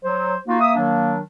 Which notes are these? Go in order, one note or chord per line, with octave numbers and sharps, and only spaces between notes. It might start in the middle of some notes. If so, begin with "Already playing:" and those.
F#3 C5
A#3 D#4 F4 F#4
E5 D#6
D#3 F#3 D4